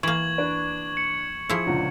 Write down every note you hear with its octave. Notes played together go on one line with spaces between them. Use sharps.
E3 A#3 C#6 G#6 F#7
D4 B4 D5
C#7
F3 E4 G#4
C#2 A#2 D3